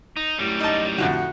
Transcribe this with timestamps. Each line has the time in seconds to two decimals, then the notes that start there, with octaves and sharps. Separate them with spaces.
0.17 D#4
0.38 F#2 G3 A3 E4 G4
0.60 D#4 D#5 A5
0.98 F2 A2 D3 F#4